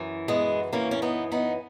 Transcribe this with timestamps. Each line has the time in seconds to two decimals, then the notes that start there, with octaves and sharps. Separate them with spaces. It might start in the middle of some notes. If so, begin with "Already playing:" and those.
Already playing: F#2 E3
0.28 G#3 B3
0.73 F#2 E3 A#3 C#4
0.91 C#4
1.02 B3 D#4
1.32 B3 D#4